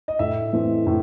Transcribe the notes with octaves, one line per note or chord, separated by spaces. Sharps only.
D#5
A2 E5
E3 A3 C4
A2